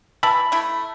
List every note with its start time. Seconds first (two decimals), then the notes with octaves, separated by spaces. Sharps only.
0.23 E3 E5 A5 B5
0.52 A3 E4